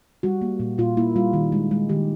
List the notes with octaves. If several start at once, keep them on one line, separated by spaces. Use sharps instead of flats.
G3 F#4
A#3
A#2
A#2 F4
A#3 E4
G3 F4
D#3
G#3
G#3
D#3 G4